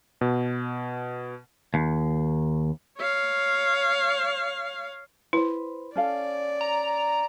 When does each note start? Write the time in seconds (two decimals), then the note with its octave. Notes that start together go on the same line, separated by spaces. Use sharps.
0.21 B2
1.74 D#2
2.98 C#5 F5
5.33 E4 B4 C5
5.96 C#4 A4 D5 F5
6.61 A#5